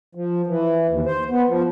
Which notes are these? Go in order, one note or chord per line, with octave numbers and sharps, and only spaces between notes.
F3
E3
D#2
C5
B3
F3